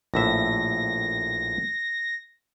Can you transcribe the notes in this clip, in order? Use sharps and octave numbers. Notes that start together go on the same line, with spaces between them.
A#1 A2 E5 A#6